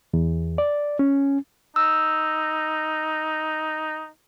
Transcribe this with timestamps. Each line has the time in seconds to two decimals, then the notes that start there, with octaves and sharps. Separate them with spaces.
0.14 E2
0.58 D5
0.99 C#4
1.76 D#4 E6